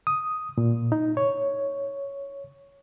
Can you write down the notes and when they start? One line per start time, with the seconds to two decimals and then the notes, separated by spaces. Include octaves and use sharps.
0.07 D#6
0.58 A#2
0.92 D#4
1.17 C#5